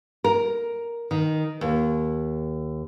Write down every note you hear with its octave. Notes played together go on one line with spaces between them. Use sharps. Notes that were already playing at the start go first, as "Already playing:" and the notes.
A#4
D#3
D#2